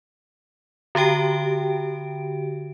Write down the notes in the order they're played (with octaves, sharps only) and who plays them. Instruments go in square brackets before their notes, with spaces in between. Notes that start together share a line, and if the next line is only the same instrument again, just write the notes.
[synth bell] D3 F#4 G4 G5 D7